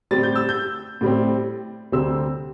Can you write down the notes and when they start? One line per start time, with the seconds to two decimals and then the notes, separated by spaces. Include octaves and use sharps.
0.11 A2 G3 C4 A6
0.23 G6
0.35 E6
0.49 G6
1.01 A2 G3 C4
1.92 D2 C3 G3 C4 E6